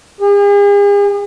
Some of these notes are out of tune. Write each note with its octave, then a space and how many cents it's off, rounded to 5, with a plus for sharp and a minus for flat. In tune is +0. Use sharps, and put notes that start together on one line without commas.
G#4 -45